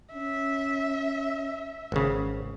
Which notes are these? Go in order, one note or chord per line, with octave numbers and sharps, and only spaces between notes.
C#4 E5
G#1 C#3